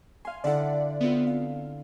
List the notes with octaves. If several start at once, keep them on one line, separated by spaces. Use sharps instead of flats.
F5 G#5 C6
D3 E4 A4 D5 F#5
B3 C4 F4
F5